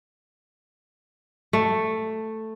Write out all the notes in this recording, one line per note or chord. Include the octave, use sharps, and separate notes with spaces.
A3